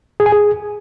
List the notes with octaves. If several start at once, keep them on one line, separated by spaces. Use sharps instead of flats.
G#4
G#5
G#4